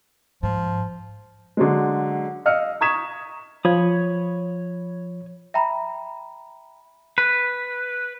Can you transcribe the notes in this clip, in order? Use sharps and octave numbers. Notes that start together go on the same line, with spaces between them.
G#2 F3
D3 F#3 G#3
D#5 F5 E6 F6 C#7
A#5 C#6 D#6 G#6 B6 E7
F3 C#5 B5 D#6
E5 G5 A#5 B5
B4